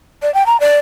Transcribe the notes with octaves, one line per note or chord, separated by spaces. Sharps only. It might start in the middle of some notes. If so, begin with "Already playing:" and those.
D5
G5
A#5
D5